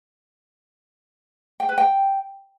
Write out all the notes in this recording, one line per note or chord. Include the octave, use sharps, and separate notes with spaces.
G5
B4
G5